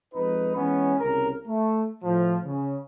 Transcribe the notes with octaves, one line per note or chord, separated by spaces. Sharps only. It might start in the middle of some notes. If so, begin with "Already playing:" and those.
F2 G#3 D#4 B4
E3 G#3 B3 C#4
C2 C#3 A#4
A3
A2 F3
C#3